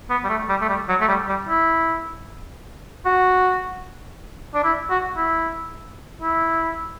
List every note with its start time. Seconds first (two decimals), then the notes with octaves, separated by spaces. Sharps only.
0.10 B3
0.24 G3
0.29 A3
0.49 G3
0.61 A3
0.69 G3
0.89 F#3
1.01 A3
1.08 G3
1.28 G3
1.48 E4
3.05 F#4
4.54 D4
4.64 E4
4.90 F#4
5.17 E4
6.22 E4